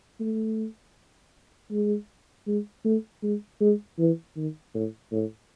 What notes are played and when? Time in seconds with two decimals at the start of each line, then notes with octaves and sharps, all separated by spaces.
0.20 A3
1.71 G#3
2.47 G#3
2.85 A3
3.23 G#3
3.61 G#3
3.99 E3
4.36 D#3
4.74 A2
5.12 A2